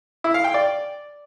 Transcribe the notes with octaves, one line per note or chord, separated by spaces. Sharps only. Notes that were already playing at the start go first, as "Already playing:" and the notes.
E4
F5
G5
D5